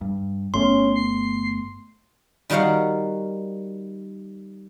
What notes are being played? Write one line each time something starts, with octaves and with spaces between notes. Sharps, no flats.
G2
G1 A3 B3 C#4 C6
C7
D#3 G3 F#4 A#4 F5 F#5